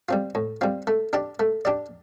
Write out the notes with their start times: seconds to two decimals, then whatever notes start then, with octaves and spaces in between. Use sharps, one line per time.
0.09 G3 C4 F4
0.35 A2
0.61 G3 C4 F4
0.87 A3
1.13 D4 G4 D5
1.40 A3
1.65 D4 G4 D5